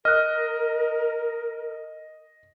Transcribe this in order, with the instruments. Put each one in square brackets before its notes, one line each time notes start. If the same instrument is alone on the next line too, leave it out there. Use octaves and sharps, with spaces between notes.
[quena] A#4 [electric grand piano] D#5 [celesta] F6 F#6